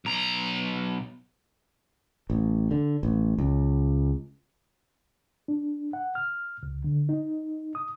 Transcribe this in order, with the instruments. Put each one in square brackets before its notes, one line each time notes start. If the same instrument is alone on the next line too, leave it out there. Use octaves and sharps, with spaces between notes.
[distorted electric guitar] B1 A#5
[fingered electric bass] A1
D3
A1
C#2
[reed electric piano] D4
F#5
F6
C#2
D3
D#4
D#6